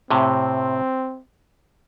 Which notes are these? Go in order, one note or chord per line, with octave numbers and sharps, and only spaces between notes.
A2 C3 C4